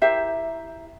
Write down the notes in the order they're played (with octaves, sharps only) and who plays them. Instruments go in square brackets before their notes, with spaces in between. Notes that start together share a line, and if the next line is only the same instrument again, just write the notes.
[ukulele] E4 G4 A#4 C5 E5